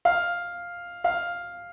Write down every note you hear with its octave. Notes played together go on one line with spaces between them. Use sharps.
F5
F5